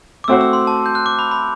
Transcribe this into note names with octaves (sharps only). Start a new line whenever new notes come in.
D6
A3 C4 F#4 C5 E6
E6
C6
A5
G6
F#6
D6
B5
B5